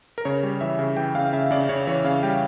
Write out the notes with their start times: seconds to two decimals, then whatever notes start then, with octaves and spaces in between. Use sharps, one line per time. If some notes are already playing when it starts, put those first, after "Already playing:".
0.18 A#4
0.25 C#3 C#5
0.43 G3
0.61 E3 E5
0.79 C#3
0.97 E3 G5
1.15 C#3 F5
1.33 C#3 E5
1.51 C#3 D5
1.69 C#3 C#5
1.87 E3 C#5
2.04 C#3 F5
2.23 G3 G5